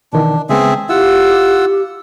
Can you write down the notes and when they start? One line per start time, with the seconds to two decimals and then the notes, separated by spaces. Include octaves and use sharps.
0.13 B2 D#3 E3 D4
0.49 C#3 G#3 B3 C4 G#4 E5
0.89 E4 F4 G4 F#5 E6